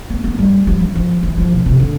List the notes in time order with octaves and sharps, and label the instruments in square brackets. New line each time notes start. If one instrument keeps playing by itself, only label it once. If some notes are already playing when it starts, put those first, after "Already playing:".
[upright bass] B3
B3
G3
F3
E3
F3
E3
F3
B2
C3
D3